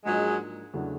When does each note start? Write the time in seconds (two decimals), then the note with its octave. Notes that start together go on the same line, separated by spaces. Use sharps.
0.05 G#2 F3 F#3 G#3 A#3 D4 F4
0.74 E2 C#3 F#3 A3 D4